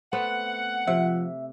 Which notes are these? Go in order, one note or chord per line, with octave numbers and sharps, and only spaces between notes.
A3 B3 C4 F#5
C3 F3 E5